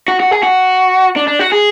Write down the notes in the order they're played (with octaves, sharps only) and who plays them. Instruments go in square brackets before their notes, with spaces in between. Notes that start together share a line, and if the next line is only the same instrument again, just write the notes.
[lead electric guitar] F#4
F#4
G#4
F#4
D4
D4
F#4
G#4